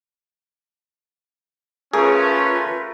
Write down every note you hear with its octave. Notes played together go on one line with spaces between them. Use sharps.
A3 C#4 F4 G#4 A#4 B4